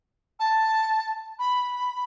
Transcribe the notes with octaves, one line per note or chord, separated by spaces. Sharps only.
A5
B5